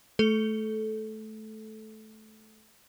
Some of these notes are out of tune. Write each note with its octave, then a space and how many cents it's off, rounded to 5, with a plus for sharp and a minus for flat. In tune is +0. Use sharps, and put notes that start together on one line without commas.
A3 -15 A4 -15